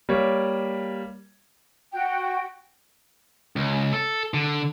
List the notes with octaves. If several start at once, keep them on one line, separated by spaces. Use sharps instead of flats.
G3 A#3 C#5
F#4 G5
C#2
A4
D3